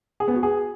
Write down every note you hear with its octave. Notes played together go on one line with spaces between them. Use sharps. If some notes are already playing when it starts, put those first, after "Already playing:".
G#4
B3
F#4
G#4